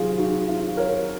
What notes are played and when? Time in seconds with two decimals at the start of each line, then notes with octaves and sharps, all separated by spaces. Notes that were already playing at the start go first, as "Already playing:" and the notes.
Already playing: C3 D#3 F#3 C4 F4 G#4
0.18 D#4 F#4
0.48 F4
0.77 A#4 C#5